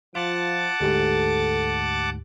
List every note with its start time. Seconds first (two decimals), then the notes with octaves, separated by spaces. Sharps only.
0.15 F3 F4 F#5 A5 D6
0.81 D2 G#2 G4 A4